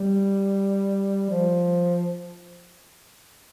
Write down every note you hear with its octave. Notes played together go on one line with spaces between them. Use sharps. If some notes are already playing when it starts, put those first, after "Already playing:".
Already playing: G3
F3